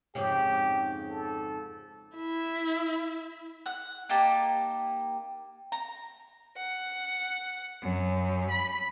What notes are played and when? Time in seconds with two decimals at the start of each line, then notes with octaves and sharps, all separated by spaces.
0.15 F2 G#2 C#3 G4
1.10 A4
2.16 E4
3.66 F#5 F#6
4.09 A#3 D#4 G4 A5
5.72 A#5
6.57 F#5
7.81 F#2
8.50 B5